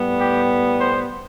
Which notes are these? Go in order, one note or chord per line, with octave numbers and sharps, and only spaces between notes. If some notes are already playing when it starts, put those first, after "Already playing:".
Already playing: A2 G3 B3
G4
C5